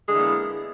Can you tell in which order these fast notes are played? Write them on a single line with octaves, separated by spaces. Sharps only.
G#3 D3 E3 A#3 B3